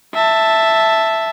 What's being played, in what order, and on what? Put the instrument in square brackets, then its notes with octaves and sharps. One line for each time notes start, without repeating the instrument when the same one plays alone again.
[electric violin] E5 A5